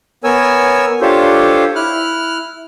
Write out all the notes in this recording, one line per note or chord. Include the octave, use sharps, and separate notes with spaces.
B3 A#4 C#5 G#5 E6
D4 F4 G4 A4 C5 C#5
E4 F6 F#6